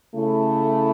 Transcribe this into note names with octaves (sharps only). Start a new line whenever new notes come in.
C#3 A3 E4